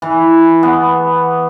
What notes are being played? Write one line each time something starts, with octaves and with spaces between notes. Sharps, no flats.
E3
B3